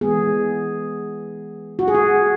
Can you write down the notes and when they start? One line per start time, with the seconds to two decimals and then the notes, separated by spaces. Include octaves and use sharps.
0.01 E3 G#3 B3 G#4
1.79 F#4
1.88 G#4
1.95 F#4